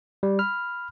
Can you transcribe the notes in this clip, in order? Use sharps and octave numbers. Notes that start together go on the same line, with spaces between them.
G3
B5 F6